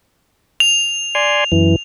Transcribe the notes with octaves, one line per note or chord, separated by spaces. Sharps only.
F7
D5 G#5 C6
F#2 E3